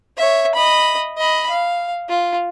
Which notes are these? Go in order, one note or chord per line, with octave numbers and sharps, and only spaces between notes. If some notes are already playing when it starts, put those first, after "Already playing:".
C#5 E5
D#5 B5
D#5 B5
F5
F4